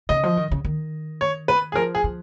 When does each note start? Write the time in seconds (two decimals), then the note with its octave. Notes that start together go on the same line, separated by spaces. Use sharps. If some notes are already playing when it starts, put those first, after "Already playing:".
0.09 C#3 D#5
0.23 F3
0.37 D#3
0.52 C#3
0.65 D#3
1.21 C#5
1.48 B4
1.72 G#4
1.75 F3 A#4
1.95 G#4
2.04 F3